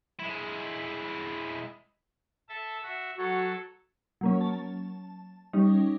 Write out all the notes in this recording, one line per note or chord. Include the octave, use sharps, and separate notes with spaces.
G#3 E4
A4 E5 A5
F#4 E5
F#3 F#4 A4 C#5
F#3 A#3 C#4
A5
G3 C#4 D#4